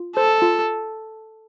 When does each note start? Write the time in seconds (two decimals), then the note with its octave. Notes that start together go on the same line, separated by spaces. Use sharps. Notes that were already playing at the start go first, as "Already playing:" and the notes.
Already playing: F4
0.16 A4 C5
0.42 F4